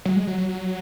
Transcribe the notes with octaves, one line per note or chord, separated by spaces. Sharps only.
F#3
G#3
F#3
F#3
F#3